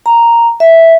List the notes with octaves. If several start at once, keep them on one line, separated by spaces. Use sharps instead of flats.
A#5
E5